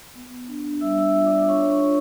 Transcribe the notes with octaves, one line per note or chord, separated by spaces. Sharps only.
B3
D4
G3 E5 E6
F4
D5 D6
D4 C#5 C#6
C#5 C#6
F4